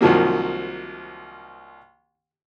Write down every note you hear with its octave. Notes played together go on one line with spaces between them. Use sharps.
C2 D#3 F3 F#3 A#3